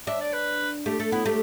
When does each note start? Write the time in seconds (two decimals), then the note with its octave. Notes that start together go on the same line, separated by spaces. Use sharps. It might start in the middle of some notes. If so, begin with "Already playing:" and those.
0.07 D4 E5
0.21 D5
0.33 B4
0.86 A3 G4
0.99 A3 A4
1.12 B3 E4
1.26 A3 G4